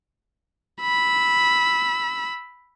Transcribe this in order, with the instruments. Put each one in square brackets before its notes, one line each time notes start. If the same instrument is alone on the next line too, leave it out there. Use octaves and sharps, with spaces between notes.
[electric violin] B5 E6